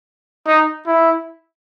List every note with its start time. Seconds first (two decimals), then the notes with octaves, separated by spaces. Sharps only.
0.47 D#4
0.87 E4